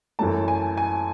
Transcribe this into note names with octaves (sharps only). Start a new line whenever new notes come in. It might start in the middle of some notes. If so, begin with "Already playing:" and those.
F#2 E3 A3 C#4 A5
G#5
G#5